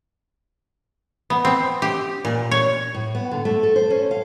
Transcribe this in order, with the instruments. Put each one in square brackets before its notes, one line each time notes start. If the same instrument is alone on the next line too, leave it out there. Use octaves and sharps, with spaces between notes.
[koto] B3
C4
G4
A#2
C#5
[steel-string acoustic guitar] A2
B3
D3
A3
A4
C5
C#4
F5